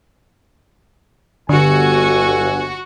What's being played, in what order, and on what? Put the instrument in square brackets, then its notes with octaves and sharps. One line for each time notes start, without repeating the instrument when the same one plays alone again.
[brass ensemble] G1 [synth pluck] D3 [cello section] F#4 [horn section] G4 A4 G#5